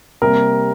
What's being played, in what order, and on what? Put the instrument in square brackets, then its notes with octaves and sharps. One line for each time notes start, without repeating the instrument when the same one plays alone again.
[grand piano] C3 G3 A#3 A#4